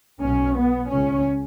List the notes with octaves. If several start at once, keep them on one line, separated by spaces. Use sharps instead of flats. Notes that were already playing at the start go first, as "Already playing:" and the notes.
B1 B2 C#4
B3
C#2 C#3 C#4